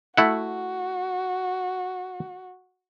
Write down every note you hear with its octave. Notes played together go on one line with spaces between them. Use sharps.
A3 E4 F#4 F#5